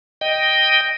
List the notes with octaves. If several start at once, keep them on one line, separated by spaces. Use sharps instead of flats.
D#5 G5